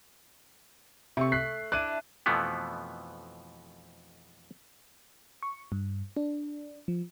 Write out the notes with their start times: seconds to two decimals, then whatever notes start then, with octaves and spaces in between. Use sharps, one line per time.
1.17 C3 A3 C#6
1.32 F#6 B6 C7
1.72 D4 E4 F#6 D#7
2.26 F2 B2 E3 F3 A3 B3
5.43 C#6
5.72 G2
6.17 D4
6.88 F3